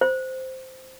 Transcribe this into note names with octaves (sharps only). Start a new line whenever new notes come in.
C5